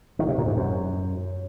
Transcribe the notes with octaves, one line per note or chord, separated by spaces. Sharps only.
D#3
C3
A#2
G#2
F#2